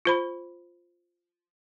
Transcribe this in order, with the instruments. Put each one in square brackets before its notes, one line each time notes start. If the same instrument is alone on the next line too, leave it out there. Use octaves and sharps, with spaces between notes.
[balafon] F4 C5 B5